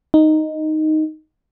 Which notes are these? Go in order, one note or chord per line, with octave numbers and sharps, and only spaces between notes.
D#4